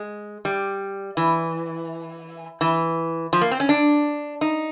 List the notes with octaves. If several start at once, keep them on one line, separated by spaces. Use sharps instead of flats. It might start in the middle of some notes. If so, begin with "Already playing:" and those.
Already playing: G#3
G3
E3
E3
F3
A#3
C4
C#4
D4
D#4